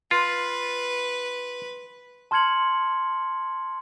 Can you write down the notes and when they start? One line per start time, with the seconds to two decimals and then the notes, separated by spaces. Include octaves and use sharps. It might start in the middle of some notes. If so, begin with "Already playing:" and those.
0.11 F4 B4 C6
2.31 A5 C6 F6 G#6 C#7 F#7